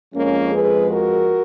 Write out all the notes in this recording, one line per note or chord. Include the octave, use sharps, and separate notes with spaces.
F2 F3 G#3 A#3 C#4
G#4 B4
F#4 A#4